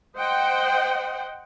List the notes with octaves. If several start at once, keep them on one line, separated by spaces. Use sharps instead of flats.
C5 D#5 F#5 G5